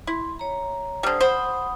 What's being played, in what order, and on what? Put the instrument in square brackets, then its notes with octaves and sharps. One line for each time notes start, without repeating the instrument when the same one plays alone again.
[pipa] E4 [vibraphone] C6
[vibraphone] C#5 A#5
[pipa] D3 G3 [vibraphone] C5 D#6
[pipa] C5 [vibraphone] F#5 B5 D#6